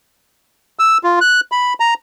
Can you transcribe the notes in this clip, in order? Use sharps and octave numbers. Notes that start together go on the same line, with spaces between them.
E6
F4
F#6
B5
A#5